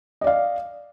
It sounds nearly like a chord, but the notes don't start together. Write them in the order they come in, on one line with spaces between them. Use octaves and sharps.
D#5 D5 F5